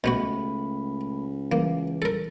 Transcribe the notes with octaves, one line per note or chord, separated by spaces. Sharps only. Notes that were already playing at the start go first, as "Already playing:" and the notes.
C#2 B2 A3 B3 F#4 B5
E3 A#3
A4 A#4